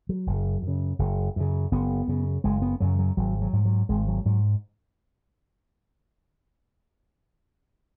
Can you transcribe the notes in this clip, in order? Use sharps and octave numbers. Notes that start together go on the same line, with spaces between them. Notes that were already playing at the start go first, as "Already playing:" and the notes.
F#3
F#1
F#2
C#3
F#1
F#2 C#3
F#1 B3
F#2 C#3
F#1 G#3
B3
F#2 C#3 F#3
F#3
G#1 F#3
F#3
G#2
F#3
G#1 G#3
F#3
G#2 F#3